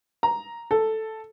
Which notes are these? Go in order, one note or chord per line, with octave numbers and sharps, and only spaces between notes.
A#5
A4